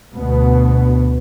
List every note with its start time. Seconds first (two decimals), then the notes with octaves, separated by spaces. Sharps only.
0.15 D2 B2 B3